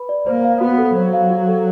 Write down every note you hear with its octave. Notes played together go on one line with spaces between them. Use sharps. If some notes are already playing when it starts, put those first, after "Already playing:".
Already playing: B4 B5
D5
A#3 C5
F5
B3 F#4
A4
F#3 C5
F5
F#4
A4